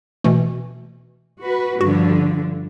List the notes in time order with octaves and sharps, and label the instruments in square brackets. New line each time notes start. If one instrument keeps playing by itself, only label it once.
[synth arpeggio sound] B2 E3 A3
[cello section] F#4 B4
[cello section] G2 D3 F3 [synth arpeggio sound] F#4